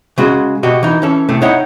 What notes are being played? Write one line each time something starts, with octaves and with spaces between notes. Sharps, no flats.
C#3 G#3 F#4
B2 F#4 G4 D#5
E3 D#4
E3 C#4 A4
A2 C3 A3
D#4 E4 C#5 F#5 G5